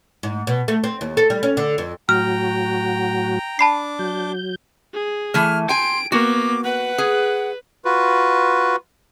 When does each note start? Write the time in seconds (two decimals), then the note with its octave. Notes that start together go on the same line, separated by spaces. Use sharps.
0.23 G#2
0.47 B2
0.68 A3
0.84 C4
1.01 D#2
1.17 A4
1.30 G3
1.43 C#4
1.57 D3
1.78 F2
2.09 A2 F#3 F#4 G5 A#5 F6
3.59 D4 A5 B5 D6 C7
3.99 F#3 G6
4.94 G#4
5.34 E3 A3 F6
5.69 G5 G#5 C6 D7
6.12 A#3 B3 F#4 D6
6.64 B4 F#5
6.98 G#4
7.85 F4 F#4 B4